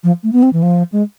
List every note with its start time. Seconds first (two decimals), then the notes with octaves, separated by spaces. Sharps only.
0.04 F3
0.23 A3
0.33 B3
0.43 C4
0.53 E3
0.63 F3
0.92 G#3